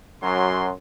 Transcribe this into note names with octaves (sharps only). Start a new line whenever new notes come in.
F#2 F#3 C6